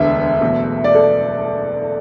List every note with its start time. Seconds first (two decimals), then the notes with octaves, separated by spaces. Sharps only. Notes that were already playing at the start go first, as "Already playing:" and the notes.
Already playing: E1 D2 D3 B3 E5
0.41 F#1 E2 B2 F#3 A3
0.84 D5
0.95 A4